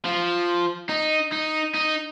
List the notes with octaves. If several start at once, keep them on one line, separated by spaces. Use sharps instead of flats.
F3
D#4
D#4
D#4